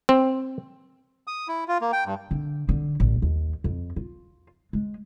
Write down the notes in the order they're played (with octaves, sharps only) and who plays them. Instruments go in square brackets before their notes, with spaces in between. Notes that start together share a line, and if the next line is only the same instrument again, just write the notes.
[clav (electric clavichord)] C4
[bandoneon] D#6
E4
F4
A#3
G5
G2
[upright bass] D3
D3
A1
D#2
F2
F4
G#3